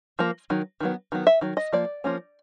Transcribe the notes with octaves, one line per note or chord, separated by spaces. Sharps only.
F3 A#3
D#3 F#3
D#3 F#3 B3
D#3 F#3 B3
E5
D#3 F#3
D#5
F3 A#3 D5
F3 A#3 C#4